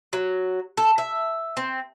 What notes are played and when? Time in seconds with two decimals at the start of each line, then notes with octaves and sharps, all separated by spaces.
0.13 F#3
0.77 A4
0.98 E5
1.57 C4